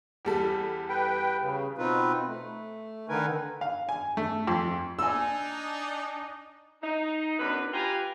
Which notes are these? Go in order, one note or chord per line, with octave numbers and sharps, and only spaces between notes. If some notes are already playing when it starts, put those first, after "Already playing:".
E2 G3 A4
B4 G5
C#3
B2 C4 D#4 F4 B4
A3
D3 D#3 D#4 A#4 B4 G#5
F5
G#5
A3
F2
D4 D#4 G#5 E6
D#4
F#2 B3 D4 B4
F4 G4 B4 G5 G#5 A#5